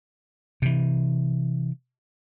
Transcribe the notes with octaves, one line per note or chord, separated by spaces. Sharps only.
C3 E3